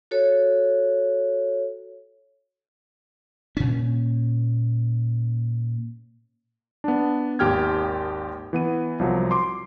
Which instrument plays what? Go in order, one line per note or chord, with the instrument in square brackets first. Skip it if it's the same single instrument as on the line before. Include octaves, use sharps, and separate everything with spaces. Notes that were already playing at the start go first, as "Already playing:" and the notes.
[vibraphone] F#4 A4 C#5
[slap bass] A#2 C#4
[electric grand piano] B3 D4
G#1 D#2 G4 G5 F6 G#6
E3 B3 D#7
C2 F3 F#3
C6 D6